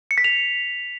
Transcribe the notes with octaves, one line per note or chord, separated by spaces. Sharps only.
C#7
B6
F7